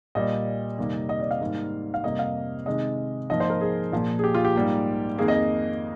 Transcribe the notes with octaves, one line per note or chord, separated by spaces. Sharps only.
A#2 G3 A#3 D#5
F2 C3 D#3 G3 A#3
D#5
D5
F5
G#2 D#3 G3 A#3
F5
F2 C3 G3 A#3 D#5
F5
C3 D#3 G#3 D#5
G#2 F3 A#3 D#5
C5
A#4
G#4
A#2 F3 A#3
G#4
G4
F4
G4
G#2 G3 A#3
F2 D#3 A#3 G#4
D#5